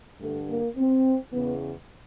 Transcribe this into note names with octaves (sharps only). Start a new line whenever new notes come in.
G2 D3 A3
A#3
C4
E2 C#3 E3 B3